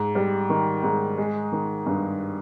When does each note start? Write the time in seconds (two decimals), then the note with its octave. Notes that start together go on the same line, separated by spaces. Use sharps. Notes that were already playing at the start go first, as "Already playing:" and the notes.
Already playing: G#2
0.15 G3
0.49 D#3
0.83 G#2
1.18 G#3
1.52 D#3
1.86 G2